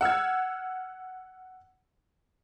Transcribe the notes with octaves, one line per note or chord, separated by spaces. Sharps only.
F#5 E6 F6 G#6